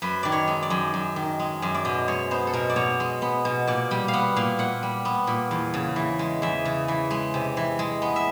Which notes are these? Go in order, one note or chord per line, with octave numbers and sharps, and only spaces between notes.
F#2 B4
D#3 D5
C#5
G#3
D5
F#2
F#2
D#3
G#3
F#2
D5
B2 D#5
G#3 C#5
B3 C5
A4
B2 A#4
D5
B2 C#5
G#3
B3
B2
A#2 D5
G3 G5
F5
B3 F#5
A#2 F5
A#2 F#5
G3
B3
A#2
E2
C#3
E3
G#3
E2 E5
C#3
E3
G#3
C3
E3
G#3
B3
E5